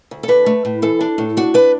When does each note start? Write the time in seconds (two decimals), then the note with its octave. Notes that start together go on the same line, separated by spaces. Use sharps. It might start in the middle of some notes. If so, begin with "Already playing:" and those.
0.11 D2
0.23 A4
0.28 D4 B4
0.46 A3
0.65 A2
0.82 E3 A4
1.01 D4
1.18 A2
1.37 D4 F#4
1.54 D4 B4